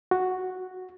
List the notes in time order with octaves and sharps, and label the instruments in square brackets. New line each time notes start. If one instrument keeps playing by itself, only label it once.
[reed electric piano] F#4